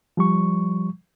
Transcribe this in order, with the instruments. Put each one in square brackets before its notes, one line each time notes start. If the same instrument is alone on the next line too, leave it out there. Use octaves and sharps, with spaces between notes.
[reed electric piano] F3 G3 C#6